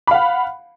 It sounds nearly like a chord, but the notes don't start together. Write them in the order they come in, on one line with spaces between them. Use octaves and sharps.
B5 F5 F#5